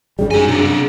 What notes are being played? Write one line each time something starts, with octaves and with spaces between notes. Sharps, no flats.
F#2 C#3 G3 G#4
D#4 G#4 G#5
C3 D4